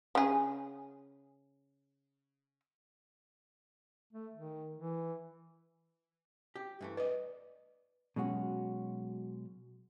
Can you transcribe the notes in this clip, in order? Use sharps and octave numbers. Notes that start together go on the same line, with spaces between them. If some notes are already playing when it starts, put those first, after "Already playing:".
C#3 G#4
A3
D#3
E3
G4
G2 E3 A3
B4 D5 D#5
B2 F#3 G#3 C#4 F#4